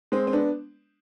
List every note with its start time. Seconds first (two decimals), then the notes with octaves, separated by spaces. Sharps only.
0.12 G#3 C4
0.27 C4
0.32 B3 D4